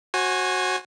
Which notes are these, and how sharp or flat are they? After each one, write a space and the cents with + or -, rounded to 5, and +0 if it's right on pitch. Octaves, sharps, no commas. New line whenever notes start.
F#4 +0 C5 +40 G#5 +0